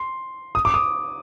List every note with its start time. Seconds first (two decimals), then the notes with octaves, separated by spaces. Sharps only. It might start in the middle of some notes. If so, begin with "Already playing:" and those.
Already playing: C6
0.55 D#6
0.65 D6
0.74 D#6